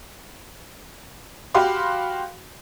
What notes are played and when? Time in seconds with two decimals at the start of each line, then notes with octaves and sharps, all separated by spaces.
1.54 F#4 G4 F5 B5 C6 D6